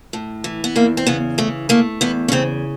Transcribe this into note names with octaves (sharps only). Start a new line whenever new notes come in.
A2
E3
B3
E2 A#3
C4
C#3 B3
E3 A3
A3 A#3
E2 B3
C#4
C#3 C4